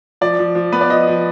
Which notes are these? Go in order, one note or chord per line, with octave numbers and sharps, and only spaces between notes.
F3 D5
F3
F3
B3 B4
D5
F3 D#5
F3